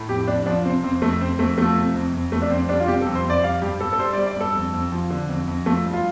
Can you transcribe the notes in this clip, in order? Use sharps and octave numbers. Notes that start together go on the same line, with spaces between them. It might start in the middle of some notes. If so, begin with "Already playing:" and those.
Already playing: A2
F2 G4
F2 D4
F3 D4
C3 C4
F2 C4
F2 A3
F2 C4
F2 A3
F3 A3
C3
F2
F2
F2 A3
D4
F2 C4
G3 D4
F4
C3 G4
A4
F2
C5
F2 D5
G3 F5
G2 G4
G2 A4
A4
G3 C5
D5
G3
D5
G2 A4
F2
F2
F3
D3
F2
F2
F3 A3
G2
F4